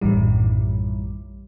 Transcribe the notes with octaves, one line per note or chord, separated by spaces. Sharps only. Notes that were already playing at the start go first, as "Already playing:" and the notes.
A#1 F#2 A2 D#3 E3 G3